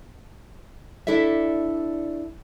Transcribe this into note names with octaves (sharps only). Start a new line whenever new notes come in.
D4 E4 A4 D5 E5